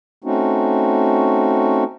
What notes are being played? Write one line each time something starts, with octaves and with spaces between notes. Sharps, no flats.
A3 C4 C#4 D#4 F#4